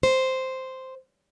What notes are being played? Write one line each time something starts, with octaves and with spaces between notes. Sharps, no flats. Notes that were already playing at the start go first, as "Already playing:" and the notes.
C5